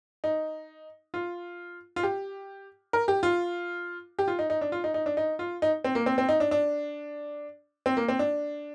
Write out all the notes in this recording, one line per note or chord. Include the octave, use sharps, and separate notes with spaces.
D#4
F4
F4
G4
A#4
G4
F4
G4
F4
D#4
D#4
D4
F4
D#4
D#4
D4
D#4
F4
D#4
C4
A#3
C4
C4
D#4
D4
D4
C4
A#3
C4
D4